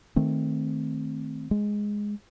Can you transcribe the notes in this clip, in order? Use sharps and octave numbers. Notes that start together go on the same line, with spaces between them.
D#3 A3 C4
G#3